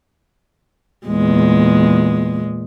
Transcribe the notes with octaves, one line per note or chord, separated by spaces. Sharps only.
E2 A#2 G#3